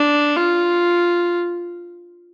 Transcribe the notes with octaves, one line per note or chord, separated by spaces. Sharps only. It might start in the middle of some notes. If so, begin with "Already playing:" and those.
Already playing: D4
F4